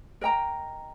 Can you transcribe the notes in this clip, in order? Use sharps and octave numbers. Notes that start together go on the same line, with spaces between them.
A#4 D#5 G5 A#5